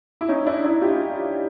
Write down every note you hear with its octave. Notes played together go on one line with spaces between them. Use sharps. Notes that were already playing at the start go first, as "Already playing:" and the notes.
E4
C#4 D#4
D4 E4
D4 E4
F4 G4